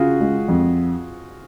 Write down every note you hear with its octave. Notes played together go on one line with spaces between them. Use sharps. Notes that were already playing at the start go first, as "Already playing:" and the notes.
Already playing: C#3 F4 F#4 G#4
G#3
F2